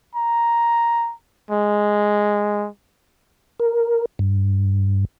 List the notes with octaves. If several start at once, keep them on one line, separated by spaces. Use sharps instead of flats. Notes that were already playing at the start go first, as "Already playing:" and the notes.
A#5
G#3
A#4
G2